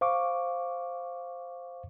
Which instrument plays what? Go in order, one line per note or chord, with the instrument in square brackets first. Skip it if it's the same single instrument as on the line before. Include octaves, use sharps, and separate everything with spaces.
[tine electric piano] C5 F5 C#6 D6